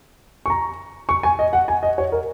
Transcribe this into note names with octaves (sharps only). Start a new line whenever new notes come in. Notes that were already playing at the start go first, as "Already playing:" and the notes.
C#6
A#5
C#6
G#5
D#5
F#5
G#5
D#5
C#5
A#4